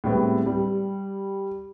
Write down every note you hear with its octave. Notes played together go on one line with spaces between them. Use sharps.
A2 G3 G#3 B3 C4
G3